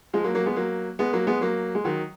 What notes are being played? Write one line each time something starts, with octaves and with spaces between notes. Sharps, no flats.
F3 G#3
F#3 A#3
F#3 A#3
G#3 B3
F#3 A#3
G#3 B3
F#3 A#3
G#3 B3
F#3 A#3
G#3
D#3 F#3